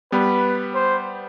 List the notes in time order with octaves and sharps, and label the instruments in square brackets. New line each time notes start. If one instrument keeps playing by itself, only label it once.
[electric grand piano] G3 B3 [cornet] B4
[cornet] C5